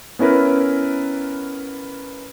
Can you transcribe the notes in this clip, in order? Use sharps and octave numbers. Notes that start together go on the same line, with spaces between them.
B3 C#4 E4 A#4 B4